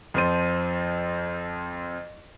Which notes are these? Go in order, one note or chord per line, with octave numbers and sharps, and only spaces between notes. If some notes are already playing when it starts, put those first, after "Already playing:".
F2 F3 C5 D#7